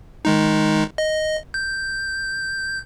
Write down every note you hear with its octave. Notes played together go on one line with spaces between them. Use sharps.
D#3 G#3 D#4
D#5
G6